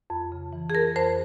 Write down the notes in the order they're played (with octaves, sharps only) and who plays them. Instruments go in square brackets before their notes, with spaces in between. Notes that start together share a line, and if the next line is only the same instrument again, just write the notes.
[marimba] F2
C#3
E3
G#4
F2 A#4
F2 C5